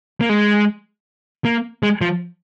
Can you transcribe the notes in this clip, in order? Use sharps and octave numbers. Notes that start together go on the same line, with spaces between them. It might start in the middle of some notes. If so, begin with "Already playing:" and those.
A#3
G#3
A#3
G#3
F3